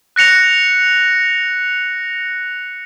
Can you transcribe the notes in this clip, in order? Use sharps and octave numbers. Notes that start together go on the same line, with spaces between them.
F#6 A#6 C#7 F7